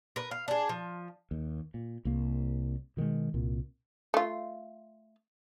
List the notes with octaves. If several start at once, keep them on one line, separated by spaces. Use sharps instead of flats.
A#4 B4
F5
D4 G#4
F3
D#2
A#2
C2 A#3
B2 D#3 E3 G#3
C2 A#2
A3 F4